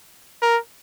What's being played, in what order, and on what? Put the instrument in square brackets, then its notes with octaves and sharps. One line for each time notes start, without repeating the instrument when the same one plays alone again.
[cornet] A#4